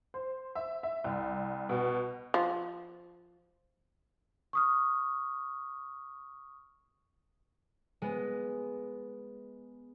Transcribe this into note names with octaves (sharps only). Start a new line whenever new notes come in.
C5
E5
E5
C2
B2
F3
C#6 D#6 F6
G#3 B3